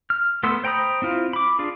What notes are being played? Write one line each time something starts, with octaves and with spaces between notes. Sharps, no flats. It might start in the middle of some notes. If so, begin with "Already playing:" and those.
F6
A3 B3 A4 C6 E6
C5 G5 A#5 B5 D#6
C4 E4 F4
B5 D6
D4 F4 G#4